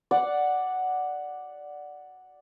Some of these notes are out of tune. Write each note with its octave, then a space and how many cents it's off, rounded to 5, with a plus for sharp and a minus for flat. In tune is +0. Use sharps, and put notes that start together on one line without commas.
D5 +0 F#5 +0